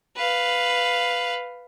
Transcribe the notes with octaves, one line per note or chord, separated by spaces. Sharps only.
B4 F5